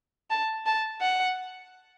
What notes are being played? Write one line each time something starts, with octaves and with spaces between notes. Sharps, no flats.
A5
A5
F#5